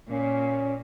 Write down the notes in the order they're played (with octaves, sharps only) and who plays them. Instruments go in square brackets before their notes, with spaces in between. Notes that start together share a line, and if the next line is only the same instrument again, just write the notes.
[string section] A#2 [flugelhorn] C#4